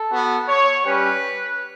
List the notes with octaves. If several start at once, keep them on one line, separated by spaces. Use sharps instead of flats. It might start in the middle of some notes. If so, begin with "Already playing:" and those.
Already playing: A4
B3 F#4
C#5
G3 C#4 G4 B4